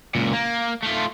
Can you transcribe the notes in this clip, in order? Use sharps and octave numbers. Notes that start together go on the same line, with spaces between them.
C#2 A#2
A#3
A3 F4